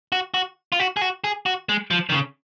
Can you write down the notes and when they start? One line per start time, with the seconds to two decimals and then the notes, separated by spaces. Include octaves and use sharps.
0.12 F#4
0.34 F#4
0.72 F4
0.80 F#4
0.97 G#4
1.01 F#4
1.24 G#4
1.46 F#4
1.69 G#3
1.91 F3
2.09 D#3
2.12 C#3